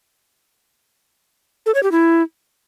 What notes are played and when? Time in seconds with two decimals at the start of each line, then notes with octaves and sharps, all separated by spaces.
1.66 A4
1.75 C#5
1.83 G4
1.92 E4